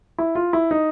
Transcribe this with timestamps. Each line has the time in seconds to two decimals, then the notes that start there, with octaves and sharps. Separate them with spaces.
0.19 E4
0.35 F4
0.53 E4
0.71 D#4